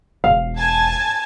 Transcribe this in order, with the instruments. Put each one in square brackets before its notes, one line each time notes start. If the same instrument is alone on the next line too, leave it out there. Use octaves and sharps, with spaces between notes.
[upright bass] E1 [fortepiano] F5
[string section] G#5 A5 G#6